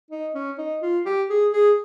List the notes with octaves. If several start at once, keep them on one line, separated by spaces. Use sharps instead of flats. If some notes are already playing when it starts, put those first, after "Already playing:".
D#4
C#4
D#4
F4
G4
G#4
G#4